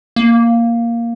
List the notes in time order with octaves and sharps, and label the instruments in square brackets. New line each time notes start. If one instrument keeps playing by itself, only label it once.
[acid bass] A#3